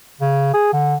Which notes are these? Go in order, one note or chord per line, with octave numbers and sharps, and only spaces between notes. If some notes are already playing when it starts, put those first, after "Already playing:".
C#3
G#4
D3